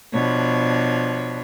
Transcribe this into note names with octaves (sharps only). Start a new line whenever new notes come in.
B2 F3 D4 C#5